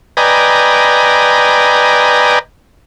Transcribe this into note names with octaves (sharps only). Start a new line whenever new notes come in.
B4 D5 D#5 G5 G#5 A#5